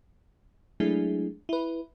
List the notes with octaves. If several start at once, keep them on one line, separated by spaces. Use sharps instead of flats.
F#3 G#3 A3 D4 E4 G#4
E4 B4